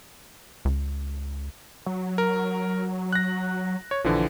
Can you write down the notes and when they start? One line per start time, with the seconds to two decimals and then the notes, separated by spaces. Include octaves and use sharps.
0.65 C#2
1.86 F#3
2.18 A#4
3.13 F#6 A#6
3.91 C#5
4.04 A#1 D3 E3 F3